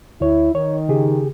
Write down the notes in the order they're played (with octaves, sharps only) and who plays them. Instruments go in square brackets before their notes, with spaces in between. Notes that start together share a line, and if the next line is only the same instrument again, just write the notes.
[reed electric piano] D2 C#5 [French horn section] E4
[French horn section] D#3 [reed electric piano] C#5
[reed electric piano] C#3 G4 G#4